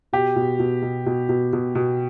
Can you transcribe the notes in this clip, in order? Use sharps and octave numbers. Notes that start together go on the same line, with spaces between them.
B2 G4
B2
B2
B2
B2
B2
B2
B2